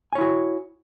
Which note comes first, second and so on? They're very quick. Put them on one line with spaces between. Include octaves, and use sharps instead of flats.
G#5 C#5 E4 F#4